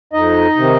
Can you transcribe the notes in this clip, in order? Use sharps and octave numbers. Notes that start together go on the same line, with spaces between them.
F2 D#4 D#5
C3 D#3